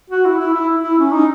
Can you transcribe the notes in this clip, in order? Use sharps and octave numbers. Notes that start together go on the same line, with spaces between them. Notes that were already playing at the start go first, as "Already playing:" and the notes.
F#4
E4
E4
E4
E4
C#4
D#4